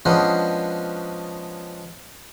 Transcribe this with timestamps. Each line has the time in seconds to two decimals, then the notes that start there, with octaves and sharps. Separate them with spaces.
0.05 F3 G#3 B3 C#4 D4 C5